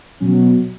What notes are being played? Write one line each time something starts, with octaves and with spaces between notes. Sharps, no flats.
B2 F#3 C#4